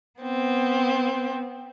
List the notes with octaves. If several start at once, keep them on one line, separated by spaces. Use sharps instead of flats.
B3 C4